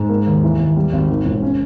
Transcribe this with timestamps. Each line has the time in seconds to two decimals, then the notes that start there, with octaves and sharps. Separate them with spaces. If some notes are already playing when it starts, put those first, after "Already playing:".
Already playing: G#2
0.09 A#3
0.27 D#2
0.43 E3
0.59 D#2
0.77 G3
0.92 G#1
1.09 D#3
1.25 E1
1.42 C#4